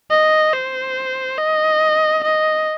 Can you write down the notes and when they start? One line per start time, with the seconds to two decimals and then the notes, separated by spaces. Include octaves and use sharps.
0.11 D#5
0.54 C5
1.38 D#5
2.24 D#5